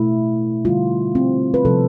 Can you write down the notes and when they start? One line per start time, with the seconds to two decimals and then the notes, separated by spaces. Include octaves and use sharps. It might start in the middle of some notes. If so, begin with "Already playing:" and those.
Already playing: B2 A3 E4
0.65 D3 G3 F4
1.15 C4
1.54 B4
1.65 C3 F3 A3 A4